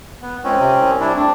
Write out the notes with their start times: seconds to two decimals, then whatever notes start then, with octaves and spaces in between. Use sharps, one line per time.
0.22 B3
0.44 C#2 C4 C#4
0.60 C3
0.80 C2
1.00 C3 D4 E4
1.15 A3 C4 D4